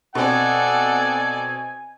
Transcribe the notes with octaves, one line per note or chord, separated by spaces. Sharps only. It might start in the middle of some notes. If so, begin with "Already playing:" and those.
B2 C4 A4 D5 F#5 G#5